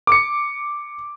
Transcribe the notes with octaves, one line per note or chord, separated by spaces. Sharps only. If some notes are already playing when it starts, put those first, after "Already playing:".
D6 C#7